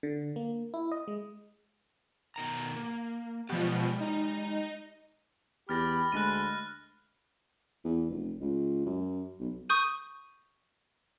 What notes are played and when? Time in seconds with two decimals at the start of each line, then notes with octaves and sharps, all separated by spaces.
0.03 D3
0.36 A#3
0.74 E4
0.92 D#5
1.08 G#3
2.36 B2 D#3 A#5
2.76 A#3
3.49 B2 F3 G#3 G4
4.01 D#4
5.69 E2 G4 B5 F6 A6 A#6
6.12 D2 G#3 F#6 A#6 D#7
7.85 E2
8.10 F1
8.41 C#2
8.86 F#2
9.40 B1
9.69 C#6 D#6 G6 D#7